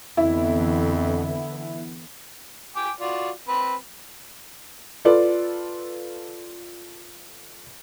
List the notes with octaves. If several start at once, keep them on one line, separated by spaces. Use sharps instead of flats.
F2 D3 E3 B3 E4
G5 G#5 D6
F4 F#4 D5
C4 B4
F4 A4 B4 D5